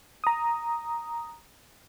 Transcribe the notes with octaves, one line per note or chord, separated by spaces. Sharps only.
A#5 D#6